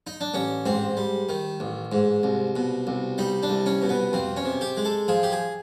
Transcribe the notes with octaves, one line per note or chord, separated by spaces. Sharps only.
D#4
D4
A1 C#4
G#2 C4
G3
D#3
A1
G#2
C2
B2
C2
G3 D#4
D4
C2
C#4
B2
B3
F2 C4
C#4
C3
G4
G#3
A4
F3 G#4
G4
G#4